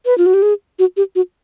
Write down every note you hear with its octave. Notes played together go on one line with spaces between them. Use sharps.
B4
F4
F#4
G4
G#4
F#4
G4
F#4